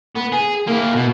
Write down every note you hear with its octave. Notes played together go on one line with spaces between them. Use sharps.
B3
G#4
A#3 E4
B2